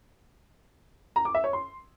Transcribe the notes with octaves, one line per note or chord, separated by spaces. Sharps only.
A#5
D6
E5
C#5
C6